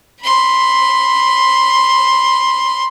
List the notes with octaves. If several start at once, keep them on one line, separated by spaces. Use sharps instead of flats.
B5 C6